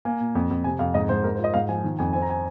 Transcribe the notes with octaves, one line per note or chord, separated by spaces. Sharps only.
A#3 G#5
A#2
F2
F2
C3 G#5
F2 F5
G#2 D#5
G#2 C5
G#2 A#4
C5
F4
D#5
G#2 F5
F3 G#5
D#3
F2 G#5
C4 G#5
A#5
G#5